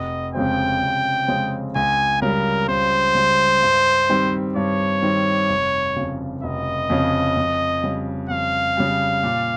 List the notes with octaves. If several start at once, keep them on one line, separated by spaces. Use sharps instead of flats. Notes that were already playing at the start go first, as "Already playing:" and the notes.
Already playing: F1 D#5
F2 C#3 G#3 C4 G5
F1
F2 C#3 G#3 C4
C#2 G#5
C#3 G3 A#4
C#2 C5
C#3 G3
G2
D#3 G3 C4
G2 C#5
D#3 G3 C4
F1
F2 C#3
F1 D#5
F2 C#3
F2
C#3 G3
F2 F5
C#3 G3
A#2